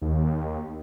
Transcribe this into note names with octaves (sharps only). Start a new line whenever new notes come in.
D#2